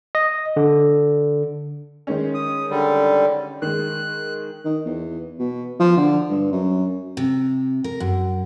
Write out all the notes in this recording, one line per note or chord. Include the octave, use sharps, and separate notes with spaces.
D#5
D3
D#3 G#3 C#4
D#6
D3 G3
D#3 G#3 F#6
D#3
E2
B2
F3
D3
G2
F#2
C3
A#4
F#2